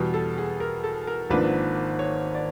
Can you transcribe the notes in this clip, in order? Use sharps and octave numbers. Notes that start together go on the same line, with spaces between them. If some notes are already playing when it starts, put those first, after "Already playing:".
Already playing: E2 B2 G3
A4
G#4
A#4
A4
A#4
G#1 G#2 F3 A#3 D4 B4
C#5
D5